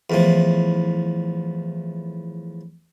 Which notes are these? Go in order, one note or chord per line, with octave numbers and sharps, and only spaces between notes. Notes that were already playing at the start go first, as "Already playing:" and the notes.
E2 A2 F3